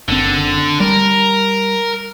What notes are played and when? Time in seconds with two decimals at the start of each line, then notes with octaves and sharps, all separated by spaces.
0.09 F#1 D3 C4
0.80 G3 A#4